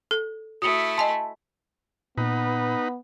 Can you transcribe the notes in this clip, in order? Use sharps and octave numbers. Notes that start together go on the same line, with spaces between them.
A4
A3 E4 F#4 D#6 C#7
D#5 G#5 A5 C6
A#2 B3 D#4 B4